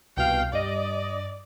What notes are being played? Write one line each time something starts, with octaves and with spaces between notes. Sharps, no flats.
C2 B2 F5 G5
G2 D5 D#5